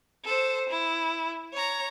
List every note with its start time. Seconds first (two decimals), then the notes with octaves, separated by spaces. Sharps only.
0.25 A4 C5
0.69 E4
1.53 C#5 A#5